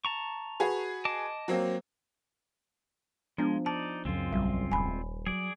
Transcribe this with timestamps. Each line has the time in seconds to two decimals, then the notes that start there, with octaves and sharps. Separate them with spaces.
0.05 A5 A#5 C#6
0.60 F#4 G#4 B4
1.05 D#5 A5 D6
1.48 F#3 A#3 C4
3.38 F3 G#3 B3 D4
3.66 D#4 D5 A5
4.05 C#2 F#2 G#3 C4 F4
4.33 A#1 G3
4.72 D#1 G#5 B5
5.26 F#3 G#4 D5